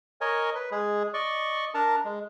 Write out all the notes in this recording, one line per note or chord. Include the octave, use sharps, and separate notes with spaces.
A#4 C#5 D#5 G#5
B4
G#3 G#4
D5 D#5 C#6
D4 A#4 A5 A#5
G#3